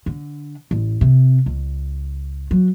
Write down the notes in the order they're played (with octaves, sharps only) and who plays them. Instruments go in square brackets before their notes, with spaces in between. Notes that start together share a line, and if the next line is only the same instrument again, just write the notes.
[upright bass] D3
A1
C3
C#2
F#3